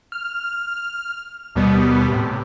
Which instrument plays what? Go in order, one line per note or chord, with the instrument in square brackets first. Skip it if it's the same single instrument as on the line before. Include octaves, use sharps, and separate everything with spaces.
[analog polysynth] F6
D#2 B2 G3 B3
A2 C3